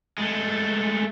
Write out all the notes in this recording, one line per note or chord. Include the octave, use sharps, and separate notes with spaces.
G#3 A3